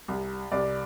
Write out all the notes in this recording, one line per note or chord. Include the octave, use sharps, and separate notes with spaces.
C2 C3
C2 C3 D5